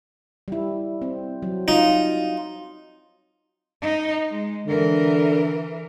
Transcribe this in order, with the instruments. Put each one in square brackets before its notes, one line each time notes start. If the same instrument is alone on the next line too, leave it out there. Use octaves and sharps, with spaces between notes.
[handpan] G3 E4
C4
F#3
[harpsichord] D#4 [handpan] F4
[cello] D#4
G#3
[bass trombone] D3 [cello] E3 A#4